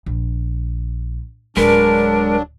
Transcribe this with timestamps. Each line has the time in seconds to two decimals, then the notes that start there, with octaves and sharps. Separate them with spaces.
0.06 A#1
1.57 D1 F#3 G#3 D4 A#4 B4